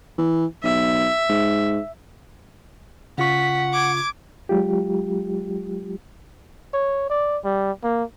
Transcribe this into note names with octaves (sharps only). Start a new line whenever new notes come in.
E3
B1 E5
G#2
C#3 F4 F#5 C#6 B6
D6 G#6
F#3 G#3 F4 G4
C#5
D5
G3
A#3